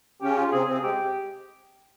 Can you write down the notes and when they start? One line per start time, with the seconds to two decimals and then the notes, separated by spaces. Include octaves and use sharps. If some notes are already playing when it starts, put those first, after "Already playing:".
0.22 C#3 C#4 G4
0.38 F4
0.52 C3 C4 G#4
0.67 C3 C4 G#4
0.83 G#3 G4